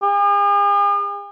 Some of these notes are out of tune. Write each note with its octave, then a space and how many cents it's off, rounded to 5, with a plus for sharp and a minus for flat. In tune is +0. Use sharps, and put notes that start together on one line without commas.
G#4 -45